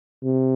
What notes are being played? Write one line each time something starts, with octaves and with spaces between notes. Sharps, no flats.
C3